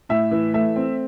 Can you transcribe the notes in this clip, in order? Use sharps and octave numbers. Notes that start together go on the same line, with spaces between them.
A2 E5
E3
A3 E5
C4